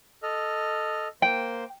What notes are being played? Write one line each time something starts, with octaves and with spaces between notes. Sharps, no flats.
A4 D#5 F6
A#3 C5 G5 C6